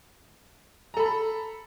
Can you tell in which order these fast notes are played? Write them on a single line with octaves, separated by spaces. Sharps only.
A#5 A4 B5